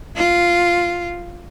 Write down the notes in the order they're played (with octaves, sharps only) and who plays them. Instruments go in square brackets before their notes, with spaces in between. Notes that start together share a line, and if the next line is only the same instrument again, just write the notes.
[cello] F4